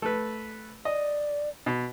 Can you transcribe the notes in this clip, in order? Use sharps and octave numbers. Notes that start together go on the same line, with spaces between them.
A3 B4
D5 D#5
B2